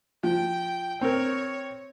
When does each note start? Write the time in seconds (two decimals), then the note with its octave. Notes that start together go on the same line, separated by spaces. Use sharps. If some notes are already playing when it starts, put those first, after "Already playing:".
0.23 F3 G5
1.01 C4 A#4 C#5